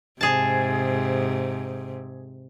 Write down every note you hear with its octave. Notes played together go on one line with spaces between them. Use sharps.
G#2 C3 G#4 A5